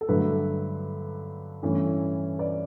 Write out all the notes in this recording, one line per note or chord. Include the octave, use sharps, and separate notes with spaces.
A4
G2 D3 F#3 A3 B4
G2 E3 A3 C#4
B4 D5